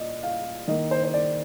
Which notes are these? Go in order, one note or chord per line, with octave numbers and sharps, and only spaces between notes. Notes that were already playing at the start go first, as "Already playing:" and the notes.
Already playing: A#2 D5 D#5
F5
D#3 A#3 D#5
C5
C5
D5